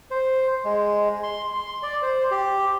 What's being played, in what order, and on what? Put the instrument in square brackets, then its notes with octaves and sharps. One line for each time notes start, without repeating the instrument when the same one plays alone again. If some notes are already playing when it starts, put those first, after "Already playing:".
[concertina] C5
G#3
C6
C6
D5
C5
G4